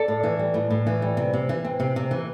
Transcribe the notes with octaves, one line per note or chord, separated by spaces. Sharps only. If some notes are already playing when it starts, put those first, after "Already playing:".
Already playing: A4 D5
A2
E3
G3
A2
A2
E3
G3
C3
C3
E3
C4
C3
C3
E3